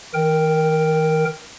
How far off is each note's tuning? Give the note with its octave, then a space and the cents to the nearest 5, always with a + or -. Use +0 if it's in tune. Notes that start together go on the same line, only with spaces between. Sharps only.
D#3 +45 A#4 +0 G5 +0